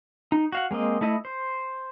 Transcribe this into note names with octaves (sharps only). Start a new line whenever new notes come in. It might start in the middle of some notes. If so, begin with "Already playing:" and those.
D#4
F#4 F5 F#5
G#3 A#3 C4 D#5
A3 E4 D#5
C5